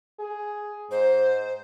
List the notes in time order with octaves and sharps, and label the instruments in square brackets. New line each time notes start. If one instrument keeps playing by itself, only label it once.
[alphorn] G#4
[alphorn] G#2 [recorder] C5